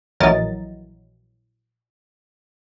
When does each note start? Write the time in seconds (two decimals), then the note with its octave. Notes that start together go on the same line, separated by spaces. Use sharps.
0.20 A#1 E3 F#3 A#4 D#5 A6